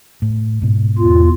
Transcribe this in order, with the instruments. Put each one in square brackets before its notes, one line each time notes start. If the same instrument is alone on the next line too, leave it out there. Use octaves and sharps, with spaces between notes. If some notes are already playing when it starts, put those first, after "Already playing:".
[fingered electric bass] A2
G#2 B2
[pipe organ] E2 F4